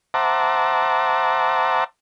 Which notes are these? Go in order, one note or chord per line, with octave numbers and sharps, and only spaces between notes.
C5 E5 F#5 A5 A#5 D6